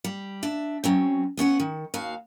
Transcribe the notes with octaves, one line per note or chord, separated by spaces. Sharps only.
G3
D4 E5
F#3 C4 C#4
B3 C#4 D#5 F#5
D#3
D#2 F#4 F5